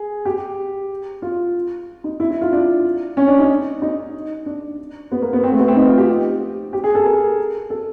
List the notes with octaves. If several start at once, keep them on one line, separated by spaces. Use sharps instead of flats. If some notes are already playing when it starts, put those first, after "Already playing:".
Already playing: G#4
G4
F4
D#4
E4
E4
F4
D4
C#4
D4
D#4
D#4
D4
B3
A#3
B3
C4
A3
B3
C4
D#4
F4
G4
G4
G#4
A4
A#4
A4